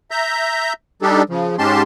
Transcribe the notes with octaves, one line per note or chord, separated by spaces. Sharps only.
E5 A#5 G6
G3 D4 D#4 G4 A4
C#3 F3
G#2 G#3 C#4 G4 A5 C6